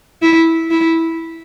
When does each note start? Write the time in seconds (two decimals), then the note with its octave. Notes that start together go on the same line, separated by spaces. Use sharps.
0.22 E4
0.70 E4